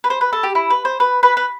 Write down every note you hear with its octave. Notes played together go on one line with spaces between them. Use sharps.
B4
C5
B4
A4
G4
E4
B4
C5
B4
B4
B4